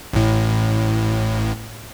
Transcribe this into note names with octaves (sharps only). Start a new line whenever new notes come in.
A1 A2